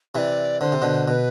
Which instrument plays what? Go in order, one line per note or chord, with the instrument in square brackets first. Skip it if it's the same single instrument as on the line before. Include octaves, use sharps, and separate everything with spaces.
[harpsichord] C3 E3 [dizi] D5 E5
[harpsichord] D3 [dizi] C5
[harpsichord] C3
B2 D3
[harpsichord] B2 [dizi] B4 C5